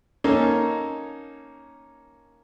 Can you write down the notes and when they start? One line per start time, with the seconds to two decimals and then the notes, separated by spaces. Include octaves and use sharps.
0.24 A#3 C#4 D#4 A4 C#5